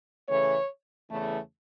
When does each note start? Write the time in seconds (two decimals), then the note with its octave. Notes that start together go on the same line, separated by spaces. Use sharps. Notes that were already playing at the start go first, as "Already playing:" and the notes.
0.29 C#3 E3 A3 C#5
1.10 E2 C#3 E3 A3